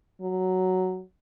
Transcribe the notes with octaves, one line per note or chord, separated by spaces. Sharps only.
F#3